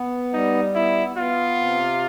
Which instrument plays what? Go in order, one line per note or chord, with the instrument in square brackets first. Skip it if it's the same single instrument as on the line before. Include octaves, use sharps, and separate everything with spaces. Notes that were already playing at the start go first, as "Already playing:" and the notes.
Already playing: [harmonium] B3
[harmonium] G3 [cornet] D#4
[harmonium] B3 [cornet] E4
[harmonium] B3 [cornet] F4
[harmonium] C3